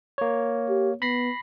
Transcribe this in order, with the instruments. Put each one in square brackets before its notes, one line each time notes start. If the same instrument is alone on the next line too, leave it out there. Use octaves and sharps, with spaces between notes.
[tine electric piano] A#3 C#5
[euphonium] G4
[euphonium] B3 [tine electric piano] B5 A#6 C7